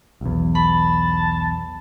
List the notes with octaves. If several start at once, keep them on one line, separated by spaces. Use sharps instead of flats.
B1 E2
A5 B5